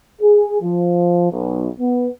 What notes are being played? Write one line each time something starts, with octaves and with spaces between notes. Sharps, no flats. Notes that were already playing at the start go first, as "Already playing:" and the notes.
G#4
F3
B1
B3